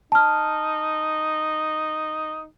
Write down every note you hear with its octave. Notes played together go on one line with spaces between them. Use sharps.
D#4 A5 F6